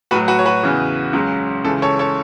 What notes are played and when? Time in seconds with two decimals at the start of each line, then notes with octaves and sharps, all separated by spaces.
0.11 A2 F#4 B4
0.16 F#3
0.28 F#4 B4
0.39 C#5
0.46 F#4 B4
0.63 E2 C#3 E3
1.13 C#2 C#3 F#3
1.64 C#2 C#3 E3 A4
1.82 A4 C#5
1.99 A4 C#5